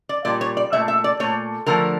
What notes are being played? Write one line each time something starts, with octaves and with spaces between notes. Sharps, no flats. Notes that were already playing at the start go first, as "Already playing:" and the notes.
D5
A#2 G3 D5
C#5
D5
A#2 A3 E5
E5
D5
A#2 A3 C#5
D3 F3 A3 A#4